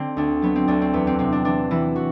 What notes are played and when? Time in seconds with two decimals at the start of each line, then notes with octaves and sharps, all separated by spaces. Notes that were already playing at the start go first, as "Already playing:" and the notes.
Already playing: D3 C4
0.17 D2 D4
0.42 F#3 B3
0.56 C4
0.68 D2 D4
0.82 C4
0.93 E2 B3
1.07 C4
1.19 C3 C4
1.32 D4
1.45 E3 D4
1.71 E3 E4
1.96 F#4